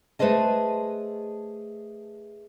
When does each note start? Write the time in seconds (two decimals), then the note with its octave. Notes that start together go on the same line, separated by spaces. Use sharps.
0.19 A3 G#4 B4 C5 D#5 A5